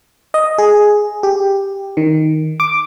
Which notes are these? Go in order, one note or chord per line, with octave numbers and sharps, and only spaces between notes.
D#5
G#4
G4
D#3
D6